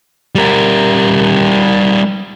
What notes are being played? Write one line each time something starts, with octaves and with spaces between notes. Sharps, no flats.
G3 A#4